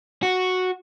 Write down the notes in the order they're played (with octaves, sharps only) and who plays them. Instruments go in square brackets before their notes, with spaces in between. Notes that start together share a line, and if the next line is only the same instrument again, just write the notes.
[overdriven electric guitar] F#4